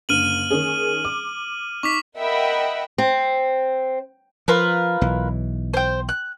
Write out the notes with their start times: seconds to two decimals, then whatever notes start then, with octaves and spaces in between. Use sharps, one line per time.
0.09 F#1 D3 F6 D#7 F#7
0.50 D#3 C#4 G#4
1.05 D6
1.83 D#4 C#6 D6 B6
2.19 A#4 D#5 E5 F#5 G5 B5
2.98 C4
4.48 F3 F4 A#4 B4
5.01 B1 E3
5.74 C5 G5
6.09 F#6